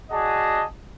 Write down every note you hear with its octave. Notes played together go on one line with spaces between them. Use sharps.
F#4 G#4 D5 D#5 F#5 A5